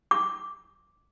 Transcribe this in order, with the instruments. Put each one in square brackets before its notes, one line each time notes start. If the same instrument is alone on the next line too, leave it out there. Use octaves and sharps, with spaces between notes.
[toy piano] D6